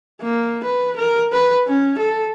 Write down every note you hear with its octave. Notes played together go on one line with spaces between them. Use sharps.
A#3
B4
A#4
B4
C#4
A4